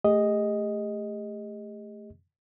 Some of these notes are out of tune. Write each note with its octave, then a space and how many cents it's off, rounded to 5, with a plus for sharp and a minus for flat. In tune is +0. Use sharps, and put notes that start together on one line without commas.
A3 +0 G4 +45 D#5 +5